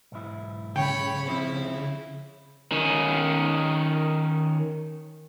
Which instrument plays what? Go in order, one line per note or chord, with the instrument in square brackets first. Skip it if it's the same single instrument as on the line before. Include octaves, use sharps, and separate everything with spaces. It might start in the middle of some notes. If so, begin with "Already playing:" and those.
[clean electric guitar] B1 G#2 E4
[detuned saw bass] C#3 [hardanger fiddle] C#5 B5 [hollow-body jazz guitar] G5
[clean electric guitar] C#2 F3 C4 [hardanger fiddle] E4
[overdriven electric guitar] D#3 C#4